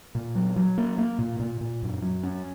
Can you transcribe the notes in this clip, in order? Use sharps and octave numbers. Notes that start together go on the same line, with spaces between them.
A#2
F#3
F#3
A#3
A#3
A#2
A#2
A#2
F#2
F#3
C#4